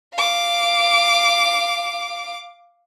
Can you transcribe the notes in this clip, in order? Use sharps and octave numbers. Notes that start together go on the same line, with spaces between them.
F5 D6